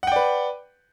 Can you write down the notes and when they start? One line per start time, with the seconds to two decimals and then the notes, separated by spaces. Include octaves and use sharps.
0.03 F#5
0.07 G5
0.12 D5
0.16 B4